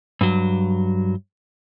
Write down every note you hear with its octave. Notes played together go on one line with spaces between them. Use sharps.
G2 F#3